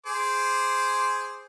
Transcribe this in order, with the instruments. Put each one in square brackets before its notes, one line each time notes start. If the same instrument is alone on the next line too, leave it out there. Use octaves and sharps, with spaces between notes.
[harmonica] G#4 C5 D6